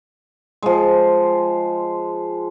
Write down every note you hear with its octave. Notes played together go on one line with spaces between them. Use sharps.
F3 G#3